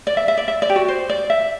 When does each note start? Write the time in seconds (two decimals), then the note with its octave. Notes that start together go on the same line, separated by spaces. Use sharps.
0.07 D5
0.17 E5
0.28 E5
0.37 D5
0.48 E5
0.62 D5
0.70 G4
0.76 F#4
0.88 C5
1.10 D5
1.30 E5